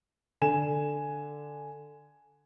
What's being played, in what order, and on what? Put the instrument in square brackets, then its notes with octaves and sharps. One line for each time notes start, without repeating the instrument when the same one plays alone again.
[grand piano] D3 G#5 E7